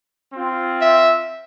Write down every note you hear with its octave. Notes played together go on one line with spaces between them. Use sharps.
C4 F4
E5